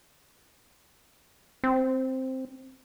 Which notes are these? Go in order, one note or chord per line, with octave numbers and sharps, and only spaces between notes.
C4